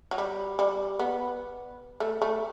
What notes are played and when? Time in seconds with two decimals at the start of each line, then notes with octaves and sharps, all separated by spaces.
0.11 F#3
0.18 G3
0.59 G3
0.99 B3
2.00 A3
2.22 A3